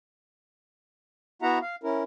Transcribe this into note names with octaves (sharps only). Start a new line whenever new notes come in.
B3 E4 F#4 E5 F#5 A#5
F5
C#4 E4 A#4